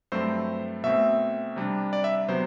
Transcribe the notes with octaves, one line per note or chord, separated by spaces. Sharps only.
G2 F#3 A3 C4 C5
B2 A3 C4 E5
C3 G3 D4
D5
E5
C3 F#3 B3 C5